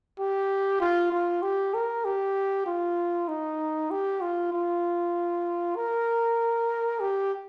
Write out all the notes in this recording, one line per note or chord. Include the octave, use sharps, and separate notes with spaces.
G4
F4
F4
G4
A#4
G4
F4
D#4
G4
F4
F4
A#4
G4